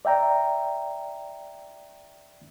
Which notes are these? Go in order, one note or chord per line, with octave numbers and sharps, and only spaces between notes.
D5 E5 G5 A#5